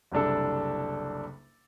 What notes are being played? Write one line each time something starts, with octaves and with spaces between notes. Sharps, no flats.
F#1 C2 D4 A4